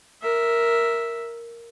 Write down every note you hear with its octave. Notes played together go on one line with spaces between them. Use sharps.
A#4 E5